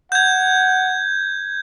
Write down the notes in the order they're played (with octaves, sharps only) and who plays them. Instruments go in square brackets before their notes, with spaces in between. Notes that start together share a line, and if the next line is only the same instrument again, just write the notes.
[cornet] F#5 [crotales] G6 G#6